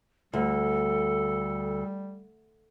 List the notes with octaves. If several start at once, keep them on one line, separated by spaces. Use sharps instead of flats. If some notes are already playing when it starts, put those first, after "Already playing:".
D2 G3 A4